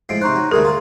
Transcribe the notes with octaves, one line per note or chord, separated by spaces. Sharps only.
A2 F3 G#3 C7 D7
C3 D#4 C5 C6 C#6 F#6
F#3
D2 G3 A3 G#4 A#4
F4 A#5 C6